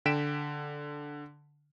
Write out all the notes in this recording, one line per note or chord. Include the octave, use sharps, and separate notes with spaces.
D3 G5 B6 D7 E7